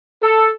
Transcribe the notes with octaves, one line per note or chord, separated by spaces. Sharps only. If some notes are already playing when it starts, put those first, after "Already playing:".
A4